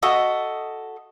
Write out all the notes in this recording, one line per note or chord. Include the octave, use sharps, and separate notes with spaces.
F#4 A4 D#5 E5